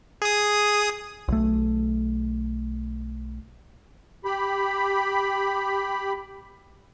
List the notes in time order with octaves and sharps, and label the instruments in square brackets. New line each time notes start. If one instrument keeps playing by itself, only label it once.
[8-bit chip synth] G#4 D#6
[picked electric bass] B1 A3
[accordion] G4 B5